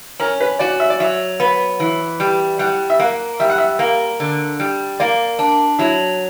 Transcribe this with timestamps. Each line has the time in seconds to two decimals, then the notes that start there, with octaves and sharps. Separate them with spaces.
0.20 C#4 A#4
0.40 B4
0.59 F#4 D5
0.80 E5
0.90 D5
1.00 F#3 E5
1.40 B3
1.80 E3
2.20 G3
2.59 G3 F#5
2.90 E5
3.00 A#3 F#5
3.40 G3 E5
3.50 F#5
3.58 E5
3.79 A#3
4.20 D3
4.60 G3
5.00 A#3 D5
5.39 D4
5.79 F#3 E4